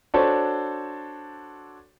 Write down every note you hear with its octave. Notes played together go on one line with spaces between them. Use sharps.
D4 F#4 A4 C5 C#5